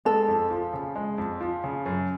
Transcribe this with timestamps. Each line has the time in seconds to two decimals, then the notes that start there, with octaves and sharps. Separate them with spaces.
0.05 G#3 A4
0.28 F2
0.50 F3
0.73 C#3
0.96 G#3
1.18 F2
1.41 F3
1.64 C#3
1.86 F#2